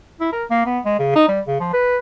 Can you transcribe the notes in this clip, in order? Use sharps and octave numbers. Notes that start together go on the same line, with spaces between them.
E4
A#4
A#3
B3
G#3
C#3
D#4
G3
C#3
F3
B4